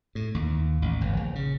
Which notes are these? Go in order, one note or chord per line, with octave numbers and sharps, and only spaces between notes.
A2
D#2
A1
G1
A#1
C#3